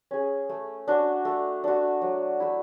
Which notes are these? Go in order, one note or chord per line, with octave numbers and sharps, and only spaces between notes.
C#4 G#4
A3
D4 F#4
A3
D4 F#4
F#3
A3 E4